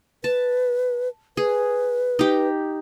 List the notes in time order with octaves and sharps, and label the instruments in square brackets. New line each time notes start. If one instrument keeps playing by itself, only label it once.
[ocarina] B4 [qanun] A5
[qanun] G#4 [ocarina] B4
[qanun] D#4 G4